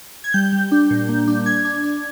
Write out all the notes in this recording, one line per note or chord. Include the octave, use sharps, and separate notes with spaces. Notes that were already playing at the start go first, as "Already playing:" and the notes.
G#6
G3 G6
G3
D4
A#2
A#3
D4
D4 G#6
D4
D4